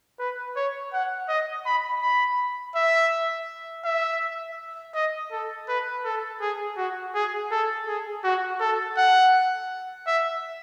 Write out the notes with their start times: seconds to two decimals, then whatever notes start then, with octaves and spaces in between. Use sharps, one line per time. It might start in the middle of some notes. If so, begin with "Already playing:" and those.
0.19 B4
0.56 C#5
0.93 F#5
1.29 D#5
1.66 B5
2.02 B5
2.75 E5
3.85 E5
4.95 D#5
5.32 A4
5.68 B4
6.05 A4
6.41 G#4
6.77 F#4
7.15 G#4
7.52 A4
7.88 G#4
8.24 F#4
8.60 A4
8.97 F#5
10.07 E5